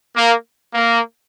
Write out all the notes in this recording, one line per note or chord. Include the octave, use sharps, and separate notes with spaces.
A#3
A#3